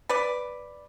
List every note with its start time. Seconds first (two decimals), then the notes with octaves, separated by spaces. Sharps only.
0.09 B4 D5